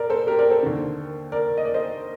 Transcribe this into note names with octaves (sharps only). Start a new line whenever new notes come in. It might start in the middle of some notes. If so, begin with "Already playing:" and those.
Already playing: A#2 A#4 D5
A4 C5
G4 A#4
A#4 D5
A4 C5
D#2 D3
A#4 D5
D#5
D5
C5 D#5